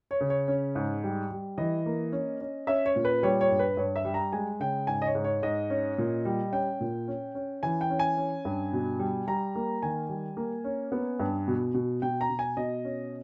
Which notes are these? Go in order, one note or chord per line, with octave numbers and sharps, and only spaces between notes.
C#5
C#3
C#5
C#4
G#2
G3
G3
E3 D#5
A#3
C#4
C#4
C#4 E5
C#5
A#2
B4
G3 C#5
C#5
G2
B4
G2 C#5
E5
G3
A#5
G#3 G#5
C#3 G5
G#2 G#5
D#5
C#5
G#2
C#5
G#2 D#5
C#4
A#2
G3
C#4 G5
A#2
C#4
C#4
E3 G#5
G5
C#4
G#5
C#4
G2
B2
G3
G3 A#5
A#3
D#3 G#5
G3
A#3
C#4
B3
G2
B2
B2
B2 G5
A#5
B2
G#5
B2 D#5
C#4